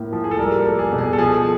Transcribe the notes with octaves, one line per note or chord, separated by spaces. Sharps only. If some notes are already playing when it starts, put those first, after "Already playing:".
Already playing: A2 A#3
F3
G#4
A4
G3 A#4
A4
A#3
G#4
B2
G#4
A4
F3 G#4